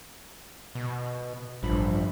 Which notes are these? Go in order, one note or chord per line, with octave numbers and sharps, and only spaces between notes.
B2
A1 G2 F3 B5